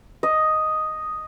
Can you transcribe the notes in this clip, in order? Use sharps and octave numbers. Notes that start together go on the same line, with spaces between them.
D#5